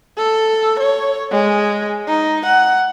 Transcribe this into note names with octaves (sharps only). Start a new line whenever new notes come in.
A4
C#5
G#3
D#4
F#5